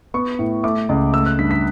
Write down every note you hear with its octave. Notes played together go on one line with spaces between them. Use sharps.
B3 C#6
A2
A3 D6
C#2
A3 E6
F#6
G2 B6
B6